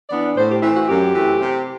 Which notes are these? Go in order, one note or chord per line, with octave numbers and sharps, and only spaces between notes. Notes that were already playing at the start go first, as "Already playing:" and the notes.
E3 B3 D4 D5
A2 C5
G4
E3 A3 C4 E4
F#4
F#2 G4
E3 A3 C4
C3